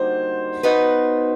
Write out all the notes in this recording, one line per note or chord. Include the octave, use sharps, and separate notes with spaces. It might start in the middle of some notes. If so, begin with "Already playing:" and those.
Already playing: D3 G3 A#3 D#4 F#4 C5
B3 D#4 F#4 B4